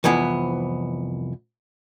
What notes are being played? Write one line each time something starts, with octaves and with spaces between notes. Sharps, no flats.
C2 F2 E3 B3